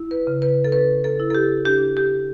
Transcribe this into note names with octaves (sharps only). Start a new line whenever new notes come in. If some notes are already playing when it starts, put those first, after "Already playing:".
Already playing: E4
B4
C#3
B4
A4
C#4 B4
A4
E4
A4
G4
D4 G4
G4